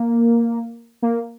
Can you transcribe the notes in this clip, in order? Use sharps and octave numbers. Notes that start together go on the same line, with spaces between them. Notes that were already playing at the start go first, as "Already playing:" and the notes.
Already playing: A#3
A#3